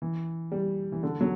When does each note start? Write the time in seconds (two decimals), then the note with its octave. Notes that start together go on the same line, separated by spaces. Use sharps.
0.02 E3
0.52 G3
0.92 E3
1.03 D3
1.21 F#3